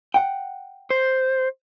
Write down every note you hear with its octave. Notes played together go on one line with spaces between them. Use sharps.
F#5 G5
C5